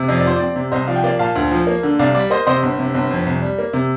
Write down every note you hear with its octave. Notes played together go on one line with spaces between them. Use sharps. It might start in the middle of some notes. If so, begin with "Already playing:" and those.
Already playing: C3
F2 D#5
D5
F3 C5
C4 D5
C3
C2 C5 D#5
F3 D5 F5
G5
A#3 D5 F5
A#2 F5 A5
D2
F3
A#3
D3
C2 D5 F5
G3 D5
A#3 C5 D#5
C3 C5 D#5
G1
C3
G1
F2
C2
G3
A#3
C3